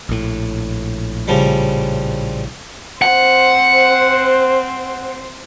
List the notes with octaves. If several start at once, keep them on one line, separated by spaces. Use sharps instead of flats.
A#1 A2
C#3 F3 G3
C4 C5 F#5